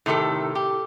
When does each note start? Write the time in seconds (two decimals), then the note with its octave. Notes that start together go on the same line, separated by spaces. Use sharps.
0.06 A2 C3 D#3 G4 A4
0.55 G4